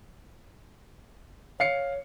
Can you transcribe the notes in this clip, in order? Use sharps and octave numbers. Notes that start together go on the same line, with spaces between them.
C#5 F5 C7 C#7